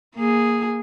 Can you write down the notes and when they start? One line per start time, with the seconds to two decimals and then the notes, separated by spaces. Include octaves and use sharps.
0.15 A#3 G#4